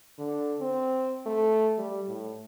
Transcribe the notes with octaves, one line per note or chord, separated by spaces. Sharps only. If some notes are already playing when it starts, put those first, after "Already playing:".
D3
C4
A3
G3
A2